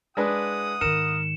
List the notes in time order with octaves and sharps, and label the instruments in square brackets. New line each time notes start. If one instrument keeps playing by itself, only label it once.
[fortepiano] G#3 D4 B4 [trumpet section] E4 F#5 D#6
[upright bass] G#2 D#3 [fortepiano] A#4 [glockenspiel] C#7 E7